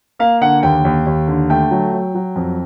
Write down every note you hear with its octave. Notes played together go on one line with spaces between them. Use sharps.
A#3 F5
D3 F#5
D#2 G5
D#2
D#2
D3
A3 G5
F#3
F#3
F#3
F2